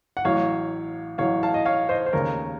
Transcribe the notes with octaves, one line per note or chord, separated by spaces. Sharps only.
F#5
A1 A2 F#3 C#5 F5
A1 A2 F#3 C#5 F5
F5 A5
D#5
C#5 F5
C5 D#5
C5
F1 D#2 C#3 A#4 C#5